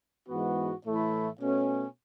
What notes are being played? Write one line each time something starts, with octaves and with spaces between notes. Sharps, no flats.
G#2 E3 G#3 B3 F#4
A2 E3 A3 E4
B2 A3 C#4